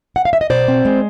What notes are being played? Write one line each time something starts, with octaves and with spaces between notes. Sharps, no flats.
F#5
F5
E5
D#5
B2 C5 D5
C4
G#3